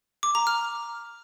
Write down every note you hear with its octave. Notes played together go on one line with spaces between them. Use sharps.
D6
A#5
F6